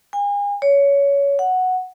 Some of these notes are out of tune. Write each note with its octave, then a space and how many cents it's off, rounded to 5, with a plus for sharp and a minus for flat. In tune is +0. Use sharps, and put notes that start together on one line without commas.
G#5 -40
C#5 +20
F#5 +0